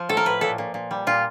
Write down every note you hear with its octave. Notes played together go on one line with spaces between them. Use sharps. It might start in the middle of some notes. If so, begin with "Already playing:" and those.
Already playing: F3
A2 A4
A#4
A2 B4
A#2 A4
A#2
A#2
G3
A#2 F4